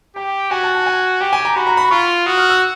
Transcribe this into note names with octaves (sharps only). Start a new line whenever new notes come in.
G4 G5
F#4 G#5
A5
A5
G#5
G4 G5
G#5
A#5
F#4 B5
A#5
B5
F4 C#6
F#4 D#6
F6
E6